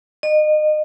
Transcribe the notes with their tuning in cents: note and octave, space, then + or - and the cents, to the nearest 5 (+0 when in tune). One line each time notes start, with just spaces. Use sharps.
D#5 -30